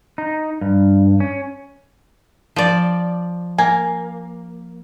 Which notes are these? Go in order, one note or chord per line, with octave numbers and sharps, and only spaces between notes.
D#4
G2
C#4
F3 D5
A#3 G#5